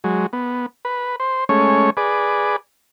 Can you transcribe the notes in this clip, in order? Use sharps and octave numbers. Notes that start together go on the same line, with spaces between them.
F#3 G#3
B3
B4
C5
G#3 A3 C#4 C#5
G#4 B4 D5